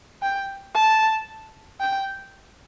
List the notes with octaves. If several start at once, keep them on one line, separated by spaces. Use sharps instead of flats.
G5
A5
G5